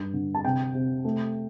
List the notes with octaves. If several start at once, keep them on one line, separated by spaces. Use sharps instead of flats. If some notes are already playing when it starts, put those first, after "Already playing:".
Already playing: G2
D3
A5
C3 G5
C3
A3